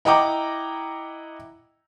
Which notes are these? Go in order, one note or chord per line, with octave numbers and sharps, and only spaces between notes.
E4 D#5 F#5 G5 A#5 D6